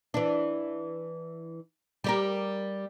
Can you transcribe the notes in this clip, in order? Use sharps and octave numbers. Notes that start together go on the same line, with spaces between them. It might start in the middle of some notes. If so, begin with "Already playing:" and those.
E3 D4
G3 G4 A#4